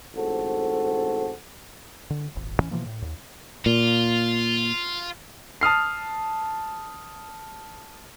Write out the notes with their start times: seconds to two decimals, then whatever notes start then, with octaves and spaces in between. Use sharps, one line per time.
0.15 A1 G#2 C4 F#4 A4
2.10 D3
2.35 D#1 G#1
2.60 A1 E2 E3 C#4
2.71 B2 E3 F3 A#3
2.86 A2
3.02 D#2
3.66 A#2 F4
5.61 A5 D#6 F6 C7